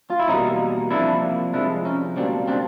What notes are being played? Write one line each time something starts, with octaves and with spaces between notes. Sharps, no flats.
F4
E4
E2 B2 G3 A#3 C#4 D#4
C2 C3 F3 A#3 D4 E4
C2 C3 F3 G#3 D4 E4
C#4 D#4
C#2 B2 G3 A#3 C4 D4
C4 D4